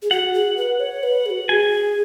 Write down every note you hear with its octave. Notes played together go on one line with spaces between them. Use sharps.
G#4
F#4 F#5
G#4
B4
C#5
B4
G#4
F#4
G#4 G#5